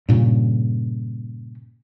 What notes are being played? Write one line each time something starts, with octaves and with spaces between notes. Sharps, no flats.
G2 A#2 C#3